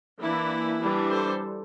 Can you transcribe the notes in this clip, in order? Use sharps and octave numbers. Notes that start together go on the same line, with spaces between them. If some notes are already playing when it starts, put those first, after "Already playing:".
E3 A#3 D4 E4
E3 G3 D4
A4 C5